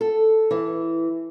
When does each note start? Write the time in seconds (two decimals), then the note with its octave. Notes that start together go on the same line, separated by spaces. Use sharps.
0.01 A4
0.51 E3